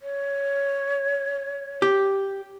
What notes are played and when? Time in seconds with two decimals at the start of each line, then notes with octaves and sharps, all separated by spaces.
0.01 C#5
1.82 G4